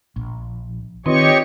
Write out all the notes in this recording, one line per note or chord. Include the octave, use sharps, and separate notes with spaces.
A#1
D#3 C4 F4 G4 B4 C#5 D#5 C#6